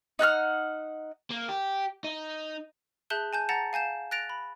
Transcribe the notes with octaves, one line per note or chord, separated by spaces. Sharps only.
D#4 F#5 A#5 F6
A#3
G4
D#4
G#4 E5 A5 F#6 G6 G7
G#5 A5 G6
F#5 A5 A#5 A6 A#6
F5 G#5 G6 E7
F#6 A6 A#6 D7 F7
B5